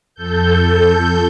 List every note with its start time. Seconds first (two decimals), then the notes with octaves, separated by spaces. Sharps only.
0.15 F2 A4 G6